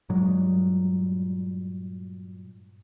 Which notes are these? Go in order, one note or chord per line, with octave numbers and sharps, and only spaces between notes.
G2 A#2 F#3 G#3